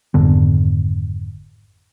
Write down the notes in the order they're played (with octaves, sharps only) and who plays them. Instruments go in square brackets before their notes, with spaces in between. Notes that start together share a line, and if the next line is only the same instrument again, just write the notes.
[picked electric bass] G#1 F2 D3 B3